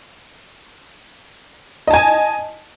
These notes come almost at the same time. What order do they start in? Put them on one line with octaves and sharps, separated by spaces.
D#5 A5 G#5